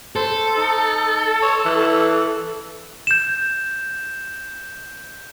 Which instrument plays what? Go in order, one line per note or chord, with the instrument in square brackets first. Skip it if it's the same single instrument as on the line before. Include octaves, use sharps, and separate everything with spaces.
[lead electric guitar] A4 [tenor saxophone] C5
[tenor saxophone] D#4
C#5
E3
[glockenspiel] G6 E7